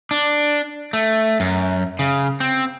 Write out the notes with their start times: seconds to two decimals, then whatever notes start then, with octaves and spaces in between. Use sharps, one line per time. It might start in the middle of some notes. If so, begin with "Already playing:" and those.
0.11 D4
0.93 A3
1.40 F#2
1.99 C#3
2.40 C4